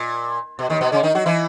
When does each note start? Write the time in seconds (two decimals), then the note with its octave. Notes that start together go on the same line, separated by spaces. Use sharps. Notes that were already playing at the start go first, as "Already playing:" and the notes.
Already playing: A#2
0.59 B2
0.70 D#2 D#3
0.81 B2 B3
0.92 C#3 C#4
1.03 D#3 D#4
1.15 F#3 F#4
1.26 E3 E4